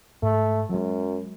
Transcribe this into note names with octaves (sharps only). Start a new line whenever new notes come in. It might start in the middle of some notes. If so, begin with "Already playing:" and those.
G#2 A3
F#2 F#3 G#3